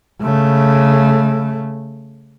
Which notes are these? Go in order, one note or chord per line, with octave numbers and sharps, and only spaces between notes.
C#3 A3